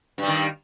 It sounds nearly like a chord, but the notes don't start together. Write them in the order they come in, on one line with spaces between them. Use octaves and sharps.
G2 G3 D#3